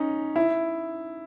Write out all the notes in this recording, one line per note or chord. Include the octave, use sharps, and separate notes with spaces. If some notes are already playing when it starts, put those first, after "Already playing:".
Already playing: C#4 D#4
E4